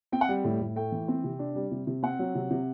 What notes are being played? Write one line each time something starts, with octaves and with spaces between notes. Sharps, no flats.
C4 G5
F#5
G3 G5
A2
A2
A3 G5
E3
C4
C3
D4
G3
C3
C3
C4 F#5
F#3
C3
C3